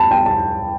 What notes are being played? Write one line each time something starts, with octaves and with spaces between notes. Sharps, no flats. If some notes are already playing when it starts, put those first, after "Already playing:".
Already playing: A5 B5
G5
A5